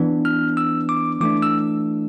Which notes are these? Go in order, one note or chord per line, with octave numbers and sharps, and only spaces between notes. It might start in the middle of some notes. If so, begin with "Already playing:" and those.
Already playing: E3 B3 D4
F6
E6
D6
E3 A3 D4 D6
E6